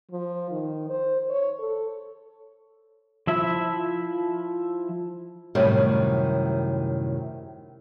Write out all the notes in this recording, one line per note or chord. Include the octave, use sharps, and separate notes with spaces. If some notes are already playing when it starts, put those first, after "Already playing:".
F3
D#3
C5
C#5
A4
F3 E4 E5
F#2 A2 C3 D#3 G3